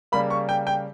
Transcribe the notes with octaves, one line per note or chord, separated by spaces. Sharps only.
C#3 G3 A#3 B5
C#6
G5
G5